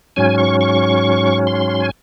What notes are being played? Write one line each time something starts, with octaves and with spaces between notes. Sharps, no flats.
G#2 F#3 C#4 G#5
C#6
C#6
C6
G#5